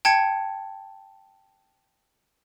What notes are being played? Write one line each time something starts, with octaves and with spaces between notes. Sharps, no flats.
G5 A5 G#6 C#7